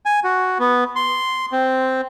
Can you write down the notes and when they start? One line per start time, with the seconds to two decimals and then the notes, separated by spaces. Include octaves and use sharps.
0.06 G#5
0.24 F#4
0.59 B3
0.96 C6
1.52 C4